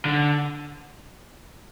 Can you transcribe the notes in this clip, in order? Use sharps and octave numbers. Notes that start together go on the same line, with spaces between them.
D3